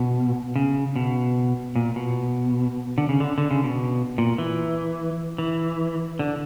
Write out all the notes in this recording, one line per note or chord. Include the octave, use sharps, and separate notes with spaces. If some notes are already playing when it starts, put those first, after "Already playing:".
Already playing: B2
C#3
B2
A#2
B2
D3
C#3
D3
D3
C#3
B2
A#2
E3
E3
D3